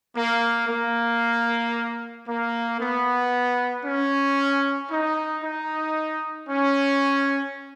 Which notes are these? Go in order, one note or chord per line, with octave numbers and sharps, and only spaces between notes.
A#3
A#3
A#3
B3
C#4
D#4
D#4
C#4